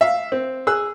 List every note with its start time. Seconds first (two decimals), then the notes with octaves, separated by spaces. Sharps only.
0.01 E5 F5
0.32 C4
0.67 G#4 E6 F#6